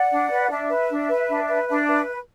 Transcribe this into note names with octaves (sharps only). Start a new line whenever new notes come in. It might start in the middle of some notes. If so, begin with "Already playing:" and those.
Already playing: D5 F#5
D4
B4
D4 E5
B4
D4
B4
D4
B4
D4 E5
B4 E5